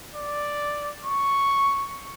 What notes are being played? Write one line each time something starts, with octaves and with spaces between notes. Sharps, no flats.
D5
C#6